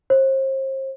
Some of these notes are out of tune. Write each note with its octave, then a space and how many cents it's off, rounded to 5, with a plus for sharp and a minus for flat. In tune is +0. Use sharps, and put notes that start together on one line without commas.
C5 +35